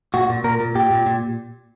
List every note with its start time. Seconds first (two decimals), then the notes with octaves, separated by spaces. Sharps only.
0.14 A#2 F#4
0.29 A#2
0.44 A#2 A#4
0.60 A#2
0.75 A#2 G4
0.91 A#2
1.06 A#2